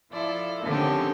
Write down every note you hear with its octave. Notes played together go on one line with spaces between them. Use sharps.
F3 E4 F4 A4 D5
D3 D#3 F3 C4 C#4 G4